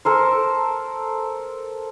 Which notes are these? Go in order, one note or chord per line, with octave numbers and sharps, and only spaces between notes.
A4 A#4 C5